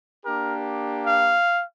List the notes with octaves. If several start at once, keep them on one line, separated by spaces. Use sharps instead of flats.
A#3 D4 G4 A#4
F5